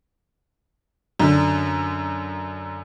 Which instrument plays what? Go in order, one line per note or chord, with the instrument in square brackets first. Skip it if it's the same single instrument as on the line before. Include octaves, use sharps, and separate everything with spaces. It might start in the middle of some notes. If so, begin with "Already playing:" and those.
[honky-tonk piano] F#2 D3